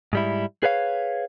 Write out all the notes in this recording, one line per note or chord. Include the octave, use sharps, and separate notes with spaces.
G#2 G3 E4
G#4 B4 C#5 F5